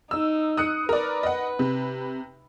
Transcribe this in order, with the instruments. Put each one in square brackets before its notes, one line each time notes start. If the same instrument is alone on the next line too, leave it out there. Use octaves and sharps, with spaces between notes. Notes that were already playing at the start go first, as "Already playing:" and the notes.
[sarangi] D#4 [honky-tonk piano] E6
[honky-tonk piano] D#6 F#6 C#7
[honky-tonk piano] A#4 D5 [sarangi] B4
[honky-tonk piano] D#5 F#5
C3